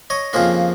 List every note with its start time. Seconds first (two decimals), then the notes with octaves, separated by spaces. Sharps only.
0.10 C#5 D#5
0.33 F2 C#3 F3 A#3 D#4